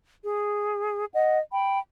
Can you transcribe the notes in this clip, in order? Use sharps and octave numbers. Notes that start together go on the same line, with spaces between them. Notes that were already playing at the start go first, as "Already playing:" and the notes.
G#4
D#5 F#5
G5 B5